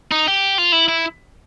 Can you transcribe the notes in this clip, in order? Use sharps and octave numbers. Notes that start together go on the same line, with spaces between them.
D#4
G4
F4
E4
E4